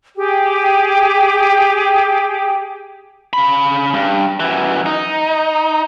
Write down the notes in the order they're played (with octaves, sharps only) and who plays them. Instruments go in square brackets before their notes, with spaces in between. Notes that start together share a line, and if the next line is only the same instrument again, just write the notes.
[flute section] G4 G#4 G5
[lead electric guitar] C#3 B5
G2
F#2 E3
D#4